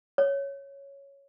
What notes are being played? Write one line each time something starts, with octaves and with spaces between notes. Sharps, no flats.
C#5